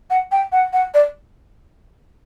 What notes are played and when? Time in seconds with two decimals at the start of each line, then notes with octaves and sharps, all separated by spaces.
0.10 F#5
0.31 G5
0.52 F#5
0.73 F#5
0.94 D5